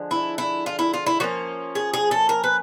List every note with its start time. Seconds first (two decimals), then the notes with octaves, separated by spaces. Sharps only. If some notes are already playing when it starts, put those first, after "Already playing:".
Already playing: D3 F3 G#3
0.11 E4
0.38 E4
0.66 F4
0.79 E4
0.94 F4
1.06 E4
1.20 F3 A#3 C#4 F#4
1.75 G#4
1.94 G#4
2.11 A4
2.29 A#4
2.44 B4